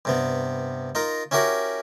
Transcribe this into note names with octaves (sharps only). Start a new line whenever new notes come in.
G2 C3 B3
D#4 F4 A#4
C#4 E4 F#4 G4 A#4 C#5